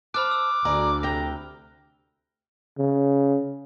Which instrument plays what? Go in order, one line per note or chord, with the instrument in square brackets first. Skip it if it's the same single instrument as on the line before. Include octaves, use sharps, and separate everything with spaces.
[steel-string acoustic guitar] C5 A5 [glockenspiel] B5 F6 F#6 [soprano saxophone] D6
[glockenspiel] E6
[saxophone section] D2 [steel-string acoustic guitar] G#4 D5 A#5
[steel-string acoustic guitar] C3 G5 [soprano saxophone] A#5
[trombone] C#3